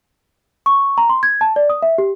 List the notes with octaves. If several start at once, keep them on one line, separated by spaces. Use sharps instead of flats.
C#6
A#5
C6
G#6
A5
D5
D#6
E5
G4